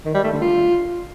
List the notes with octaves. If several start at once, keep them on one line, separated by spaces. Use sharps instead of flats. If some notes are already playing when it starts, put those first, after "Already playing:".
D#3
G3
A3
D3
F4